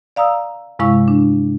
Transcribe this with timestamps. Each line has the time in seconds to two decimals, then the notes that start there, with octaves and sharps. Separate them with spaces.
0.16 D5 F5 A#5 D#6 E6
0.79 G2 C3 G#3 E4 F5 C#6
1.08 D4